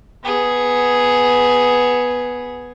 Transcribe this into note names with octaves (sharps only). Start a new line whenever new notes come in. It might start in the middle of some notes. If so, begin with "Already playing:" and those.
B3 G#4